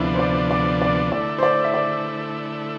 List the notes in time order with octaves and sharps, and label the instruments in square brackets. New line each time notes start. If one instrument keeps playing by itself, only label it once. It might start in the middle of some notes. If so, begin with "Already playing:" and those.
Already playing: [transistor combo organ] D2 C3 F3 B3 D4 [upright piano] C4 E4
[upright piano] C5
D5
D5
D5
[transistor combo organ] D3 A3 E4 [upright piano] D5
[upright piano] C5
D5
E5
D5